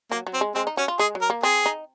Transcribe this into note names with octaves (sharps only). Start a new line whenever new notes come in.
F#3 A#3
F#3
C4
G#3
G#3 C4
D#4
C#4 F#4
F4
G#3 G#4
F#3
A#4
A#3
C4 G#4
D#4